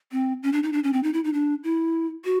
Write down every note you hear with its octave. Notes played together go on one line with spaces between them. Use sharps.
C4
C#4
D4
D#4
D4
C#4
C4
D#4
E4
D#4
D4
E4
F#4